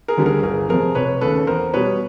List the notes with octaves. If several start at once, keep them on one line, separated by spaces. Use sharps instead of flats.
G#4 A#4
D2 D3 G3
G#4 A#4
G1 G#4 A#4
F2 C3 F3 G#4 A#4
F1 B4 C#5
D#2 C#3 A4 B4
E2 A#4 C5
B2 G3 B4 C#5